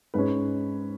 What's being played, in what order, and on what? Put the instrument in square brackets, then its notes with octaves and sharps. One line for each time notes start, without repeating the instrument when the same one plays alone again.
[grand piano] G#2 G#3 C#4 B4